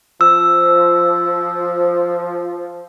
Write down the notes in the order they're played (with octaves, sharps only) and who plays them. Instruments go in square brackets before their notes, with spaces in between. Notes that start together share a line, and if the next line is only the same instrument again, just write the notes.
[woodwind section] F3 [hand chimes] E6